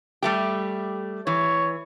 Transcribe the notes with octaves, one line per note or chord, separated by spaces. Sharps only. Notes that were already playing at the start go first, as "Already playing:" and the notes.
G3 A3 G4
E3 C#5